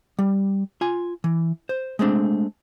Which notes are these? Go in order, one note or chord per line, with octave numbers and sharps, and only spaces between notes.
G3
F4 G#5
E3
C5
G#3 A3 C4 D4